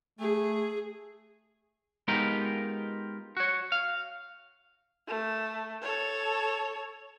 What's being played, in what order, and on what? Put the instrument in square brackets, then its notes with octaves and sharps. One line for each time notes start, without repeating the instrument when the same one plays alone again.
[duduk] A3 [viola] G#4
[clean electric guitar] G#3 B3 D#4 F4 G4 A#4
F#4 C#5
F5
[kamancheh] A3
A4 C#5